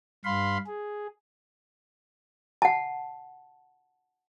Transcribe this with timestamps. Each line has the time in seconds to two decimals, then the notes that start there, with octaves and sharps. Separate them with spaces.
0.25 G2 F5 B5 C6
0.66 G#4
2.62 F#5 A5